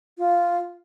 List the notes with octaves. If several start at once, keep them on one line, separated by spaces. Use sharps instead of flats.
F4